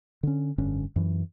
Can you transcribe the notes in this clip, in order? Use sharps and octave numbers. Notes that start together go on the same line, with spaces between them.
D3 C#4
F1 G2 D3 C#4
F#2 E3